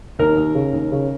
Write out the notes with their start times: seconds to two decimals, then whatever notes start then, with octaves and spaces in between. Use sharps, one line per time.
0.19 D#2 A#4
0.37 D#2
0.55 C#3
0.73 D#2
0.92 C#3